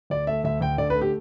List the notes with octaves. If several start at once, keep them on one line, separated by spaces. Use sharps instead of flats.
D2 D5
A3 E5
D2 E5
D2 G5
D3 D5
B4
A3
G4